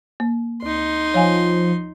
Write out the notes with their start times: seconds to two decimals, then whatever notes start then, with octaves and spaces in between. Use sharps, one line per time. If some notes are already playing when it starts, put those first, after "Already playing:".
0.20 A#3
0.63 D2 D#4 C6
1.14 F3 C#5 F5 G#5